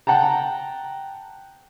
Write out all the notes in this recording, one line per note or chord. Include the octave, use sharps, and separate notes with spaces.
F#5 G5 A5 A#5